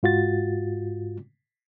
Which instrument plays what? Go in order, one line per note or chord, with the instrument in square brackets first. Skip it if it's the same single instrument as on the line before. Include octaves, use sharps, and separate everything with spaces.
[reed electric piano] G#2 F4 F#4 A6